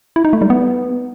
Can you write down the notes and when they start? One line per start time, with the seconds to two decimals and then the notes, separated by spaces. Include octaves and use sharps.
0.16 E4
0.25 D#4
0.33 A3
0.42 G3
0.50 B3